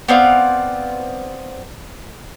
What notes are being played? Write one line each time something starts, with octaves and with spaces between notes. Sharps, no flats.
B3 C4 D5 F5